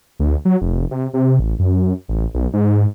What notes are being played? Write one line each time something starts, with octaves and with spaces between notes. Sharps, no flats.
D2
F#3
F1
C3
C3
A1
F#2
A1
B1
G#2